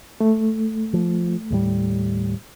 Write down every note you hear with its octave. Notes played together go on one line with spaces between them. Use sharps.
A3
F3
D#2 A2 G3